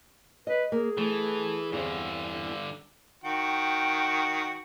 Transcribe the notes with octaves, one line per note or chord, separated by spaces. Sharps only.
B4 D#5
A#3 G#4
E3 A3
E2 G2 D3 C4
D#3 F#4 G5